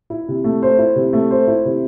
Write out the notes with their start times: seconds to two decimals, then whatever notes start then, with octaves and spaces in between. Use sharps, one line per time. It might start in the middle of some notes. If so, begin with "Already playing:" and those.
0.10 E4
0.28 C3
0.44 A3
0.63 C5
0.79 E4
0.96 C3
1.13 A3
1.31 C5
1.47 E4
1.65 C3